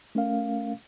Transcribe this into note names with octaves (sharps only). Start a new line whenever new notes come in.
A3 C#4 A#4 F5